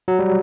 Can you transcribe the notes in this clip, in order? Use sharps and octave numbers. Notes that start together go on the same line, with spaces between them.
F#3
G3